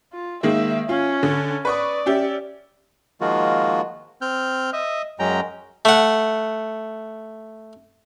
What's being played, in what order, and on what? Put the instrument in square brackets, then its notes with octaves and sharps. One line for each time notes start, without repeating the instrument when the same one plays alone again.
[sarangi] F4
[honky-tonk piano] D#3 G#3 A#3 [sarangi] E5
[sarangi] C#4 [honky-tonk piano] F4
[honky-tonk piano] D3
[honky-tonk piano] B4 C#6 D#6 [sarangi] D5
[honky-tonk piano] C#4 G4 E5
[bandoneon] D#3 F3 G#3 A#3 F4 F#4
C4 F6 G6
D#5 E5
F#2 F#3 G#3 C#4 G5 A#5
[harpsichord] A3 F#5